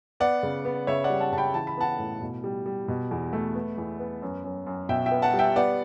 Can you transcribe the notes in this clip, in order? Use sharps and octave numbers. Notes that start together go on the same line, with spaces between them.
B3 D5 F#5
C#3
B3
C#3 C#5 E5
D5 F#5
G3
F#5 A5
C#3 A5
G5 B5
E3 A5
B5
B3 F#5 A5
A2
B2
G3
G3
B2
E2
A3
B3
E2
B3
F#2
F#2
F#2
B2 E5 G5
E5 G5
B3
F#5 A5
G3
E5 G5
B3 D5 F#5